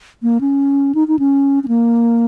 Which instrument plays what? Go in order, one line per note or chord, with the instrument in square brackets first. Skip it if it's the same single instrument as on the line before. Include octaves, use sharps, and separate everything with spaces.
[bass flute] A#3
C#4
D#4
D#4
C#4
C#4
A#3